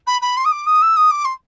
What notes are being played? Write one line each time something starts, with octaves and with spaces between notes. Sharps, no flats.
B5
B5
C6
D#6
D6
D#6
E6
D#6
D6
C6